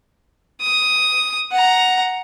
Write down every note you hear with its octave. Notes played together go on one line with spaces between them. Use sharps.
D#6
F#5 A#5